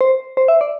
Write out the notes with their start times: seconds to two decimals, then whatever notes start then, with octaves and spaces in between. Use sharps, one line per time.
0.01 C5
0.37 C5
0.48 E5
0.61 D5